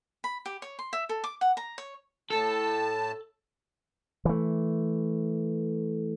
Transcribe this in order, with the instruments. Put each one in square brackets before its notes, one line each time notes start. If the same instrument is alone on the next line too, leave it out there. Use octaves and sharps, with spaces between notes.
[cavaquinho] B5
G4
C#5
C6
E5
A4
D6
F#5
A#5
C#5
[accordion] A2 A5 [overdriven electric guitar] A4
[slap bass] E3 A3